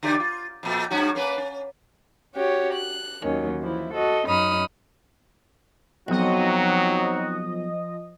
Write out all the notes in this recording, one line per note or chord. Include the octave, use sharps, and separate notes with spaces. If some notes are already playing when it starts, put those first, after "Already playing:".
D3 G4 D5
F4
F2 A#2
G2 C#4 F#4
A#3 C#4 B4
C#4
C#4 F#4 G4 C#5
F#6
D#2 D#3 F#3 C#4
E3 F3 E4
F#4 A4 D#5
F#2 C#4 D#4 B5 D#6 F6
B1 F3 F#3 C4 D#4 F#4 D#5